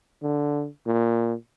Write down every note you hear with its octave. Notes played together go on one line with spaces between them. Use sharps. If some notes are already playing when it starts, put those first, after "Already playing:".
D3
A#2